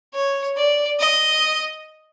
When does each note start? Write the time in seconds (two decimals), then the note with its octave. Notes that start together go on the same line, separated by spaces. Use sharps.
0.14 C#5
0.57 D5
0.99 D#5